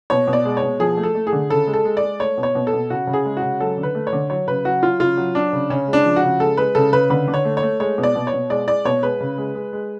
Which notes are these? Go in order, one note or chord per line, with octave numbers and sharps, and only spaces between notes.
B2 C#5
B2
D5
G#3
C#5
B2
F3 G#4
A3
A4
A3
G#4
D3
C#3 A4
G#3
A4
G#3
D5
G#3
A3 C#5
B2
C#5
B2
A4
B2
C#3 F#4
C#3
G#4
G#3
F#4
C#3
F#3 A4
D3
B4
A3
C#5
D3
F#3 C#5
C#3 B4
F#3 F#4
F#3 F4
C#3 F4
F#3
F#3 D4
C#3
C#3 C#4
G#3
D4
F3
F#4
C#3
G#3 A4
G#3 B4
C#3 A4
C#3 B4
D3 B4
D3
C#5
A3
C#5
A3
G#3 C#5
B2
D5
B2
C#5
B2
G#3 D5
G#3 D5
B2 C#5
G#3 B4
C#3
G#3
G#3
G#3